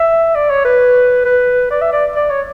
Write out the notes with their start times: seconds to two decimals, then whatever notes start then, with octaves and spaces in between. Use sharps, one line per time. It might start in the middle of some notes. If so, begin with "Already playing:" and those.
Already playing: E5
0.35 D5
0.50 C#5
0.65 B4
1.25 B4
1.71 D5
1.81 E5
1.93 D5
2.16 D5
2.30 C#5